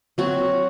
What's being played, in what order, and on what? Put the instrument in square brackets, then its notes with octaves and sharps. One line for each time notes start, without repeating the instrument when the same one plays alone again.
[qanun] F#3 C4 F#4